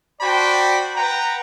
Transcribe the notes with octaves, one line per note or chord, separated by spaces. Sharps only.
F#4 C5 D5 G5 A5 B5
B4 F#5 G5 A#5